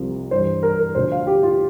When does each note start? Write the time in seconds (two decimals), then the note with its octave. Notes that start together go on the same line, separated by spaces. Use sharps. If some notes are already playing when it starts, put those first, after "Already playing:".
Already playing: C2 C3 F3
0.31 G2 E3 C5
0.63 A#4
0.80 A#4
0.95 D2 D3 F3 C5
1.12 F5
1.27 G4
1.43 F4